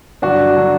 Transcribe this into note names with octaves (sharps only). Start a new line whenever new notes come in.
G2 D3 F#3 D4 F#4
D3 F#3